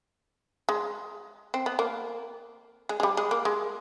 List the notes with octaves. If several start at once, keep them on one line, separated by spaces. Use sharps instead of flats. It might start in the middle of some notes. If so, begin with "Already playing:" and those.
G#3
C4
B3
A#3
G#3
G#3
G3
G#3
A#3
G#3